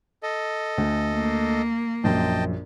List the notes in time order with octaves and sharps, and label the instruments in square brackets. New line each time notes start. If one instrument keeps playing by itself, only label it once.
[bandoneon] A4 D#5
[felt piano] D2
[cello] A#3
[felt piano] A#1 F#2 [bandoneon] D#5 G5 A5